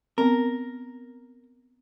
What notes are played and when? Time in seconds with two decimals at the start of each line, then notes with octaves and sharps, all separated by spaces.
0.18 B3 C4 A#4